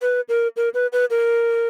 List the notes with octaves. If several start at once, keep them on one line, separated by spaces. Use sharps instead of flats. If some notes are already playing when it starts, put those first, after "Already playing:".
B4
A#4
A#4
B4
B4
A#4